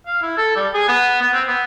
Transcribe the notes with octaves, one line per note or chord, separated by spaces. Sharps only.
F5
E4
A4
G3
G#4
B3
B3
C4
B3